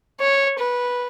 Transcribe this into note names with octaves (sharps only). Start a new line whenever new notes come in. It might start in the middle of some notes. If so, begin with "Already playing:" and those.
C#5
B4